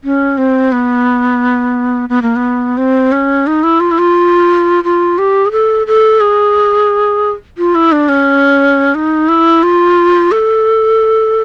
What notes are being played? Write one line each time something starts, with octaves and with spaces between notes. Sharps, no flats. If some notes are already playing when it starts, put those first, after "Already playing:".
C#4
C4
B3
B3
A#3
B3
C4
C#4
D#4
E4
F4
E4
F4
F4
G4
G#4
A4
A4
G#4
F4
E4
D4
C#4
D#4
E4
F4
A4